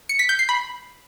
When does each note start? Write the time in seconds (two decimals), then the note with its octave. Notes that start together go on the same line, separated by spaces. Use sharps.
0.09 C#7
0.19 B6
0.29 G6
0.39 C7
0.49 B5